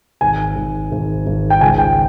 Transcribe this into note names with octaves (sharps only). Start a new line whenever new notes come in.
G#1 G#5
G#1
G#1
G#1
G5
C#2 G#5
G5